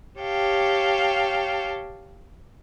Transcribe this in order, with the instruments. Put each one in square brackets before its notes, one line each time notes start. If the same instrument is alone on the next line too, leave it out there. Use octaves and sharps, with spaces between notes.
[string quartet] G4 C#5 F5 G5 A5